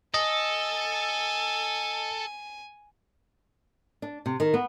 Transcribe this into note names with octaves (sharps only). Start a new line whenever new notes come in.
A4 D#5 G#5
D4
C3
D#3
B3